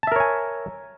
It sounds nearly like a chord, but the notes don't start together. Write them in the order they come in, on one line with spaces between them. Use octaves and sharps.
A5 E5 A#4 C#5 G#5